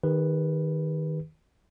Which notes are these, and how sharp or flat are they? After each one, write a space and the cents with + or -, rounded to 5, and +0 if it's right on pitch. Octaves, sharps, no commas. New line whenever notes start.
D#3 +0 G4 +45 B4 +0